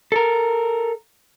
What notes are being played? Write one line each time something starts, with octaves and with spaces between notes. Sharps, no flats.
A4 A#4